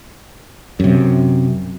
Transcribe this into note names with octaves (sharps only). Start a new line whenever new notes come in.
F#2 C3